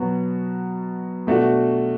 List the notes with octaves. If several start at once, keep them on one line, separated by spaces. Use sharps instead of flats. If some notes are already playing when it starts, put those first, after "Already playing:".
Already playing: B2 F#3 B3 F#4
B2 A3 D4 F#4